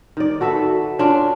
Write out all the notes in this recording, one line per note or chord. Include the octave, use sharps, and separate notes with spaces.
D#3 D5
F#4 A4 B4 E5
C#4 D4 F4